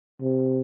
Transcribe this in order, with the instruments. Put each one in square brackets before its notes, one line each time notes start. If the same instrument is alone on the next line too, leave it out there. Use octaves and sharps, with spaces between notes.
[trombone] C3